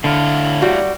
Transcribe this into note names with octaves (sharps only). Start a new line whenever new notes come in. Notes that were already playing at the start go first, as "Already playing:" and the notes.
A2 D3 E4 F5
G3 F#4 F#5